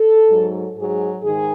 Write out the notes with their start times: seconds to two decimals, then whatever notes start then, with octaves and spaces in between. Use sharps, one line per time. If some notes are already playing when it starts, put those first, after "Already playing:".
Already playing: A4
0.28 G#2 F#3
0.76 G#2 F#3 G#4
1.23 G#2 D#3 G#4